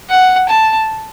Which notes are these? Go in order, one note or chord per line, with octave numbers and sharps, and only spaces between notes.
F#5
A5